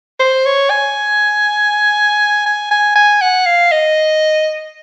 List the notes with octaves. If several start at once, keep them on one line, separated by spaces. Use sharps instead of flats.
C5
C#5
G#5
G#5
G#5
G#5
F#5
F5
D#5